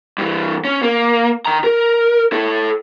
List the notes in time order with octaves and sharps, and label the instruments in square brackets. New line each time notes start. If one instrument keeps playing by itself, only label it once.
[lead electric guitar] G2 E3
C#4
A#3
D#3 A#5
A#4
E4 A4